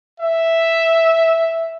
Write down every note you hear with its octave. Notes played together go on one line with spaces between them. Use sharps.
E5